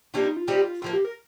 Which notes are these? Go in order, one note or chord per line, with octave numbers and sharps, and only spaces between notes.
C3 G3 A#3 D4 F4
D#4
F4
G3 C4 D#4 G4
A2 F3 A#3 F4
G4
A#4